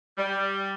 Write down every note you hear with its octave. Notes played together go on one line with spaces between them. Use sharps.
G3